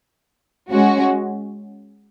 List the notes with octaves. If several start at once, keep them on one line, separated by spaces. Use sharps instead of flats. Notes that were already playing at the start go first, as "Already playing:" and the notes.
G#3 C#4 F#4